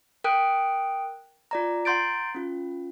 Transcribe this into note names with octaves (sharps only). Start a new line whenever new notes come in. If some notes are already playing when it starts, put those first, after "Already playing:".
A#4 G5 D#6 F#6 D7
F4 D5 A#5
F#5 A#5 C6 G6 A6 D7
C#4 F4